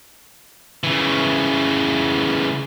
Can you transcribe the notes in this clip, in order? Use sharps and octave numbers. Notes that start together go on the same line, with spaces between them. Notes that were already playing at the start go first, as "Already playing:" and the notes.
C#3 E3